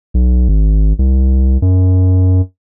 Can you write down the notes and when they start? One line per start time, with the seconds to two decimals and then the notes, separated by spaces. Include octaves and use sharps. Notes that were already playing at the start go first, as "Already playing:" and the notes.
0.14 B1
0.49 G#1
0.99 C2
1.62 F#2